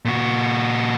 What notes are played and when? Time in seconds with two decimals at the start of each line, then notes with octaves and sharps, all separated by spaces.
0.05 A#2 F#4